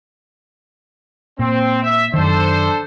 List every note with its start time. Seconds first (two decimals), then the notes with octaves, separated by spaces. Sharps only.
1.39 A#2 C4
1.82 E5
2.14 F#2 D#3 D4 A4 C5